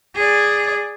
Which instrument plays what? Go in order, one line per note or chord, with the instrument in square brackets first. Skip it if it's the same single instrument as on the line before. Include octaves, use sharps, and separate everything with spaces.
[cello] G#4 D5